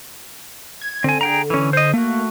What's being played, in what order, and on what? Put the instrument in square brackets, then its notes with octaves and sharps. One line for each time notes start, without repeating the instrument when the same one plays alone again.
[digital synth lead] G#6
[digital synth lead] D3 [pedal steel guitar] C4 G#5
[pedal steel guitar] G#4 G5 A#5
E3 C#4
C5 D#5
[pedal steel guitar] A3 F#4 [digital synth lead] A#3